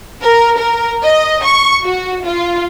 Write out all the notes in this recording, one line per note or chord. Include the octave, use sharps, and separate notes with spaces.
A#4
A#4
D#5
C#6
F#4
F4